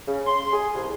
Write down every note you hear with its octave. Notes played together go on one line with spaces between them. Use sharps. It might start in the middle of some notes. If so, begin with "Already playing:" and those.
C#3
C6
G#4
C2